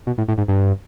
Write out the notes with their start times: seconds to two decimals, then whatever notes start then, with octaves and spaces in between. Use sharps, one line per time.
0.07 B2
0.18 A2
0.28 A2
0.38 G#2
0.48 G2